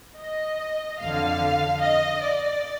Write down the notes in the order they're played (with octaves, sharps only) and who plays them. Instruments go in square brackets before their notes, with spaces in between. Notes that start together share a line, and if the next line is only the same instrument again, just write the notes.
[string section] D#5
F2 D3 F5
D#5
D5